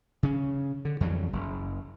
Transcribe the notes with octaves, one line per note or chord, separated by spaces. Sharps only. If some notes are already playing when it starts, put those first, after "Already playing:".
C#3 C#4
D3
F2 E3 F#3 G3
F#1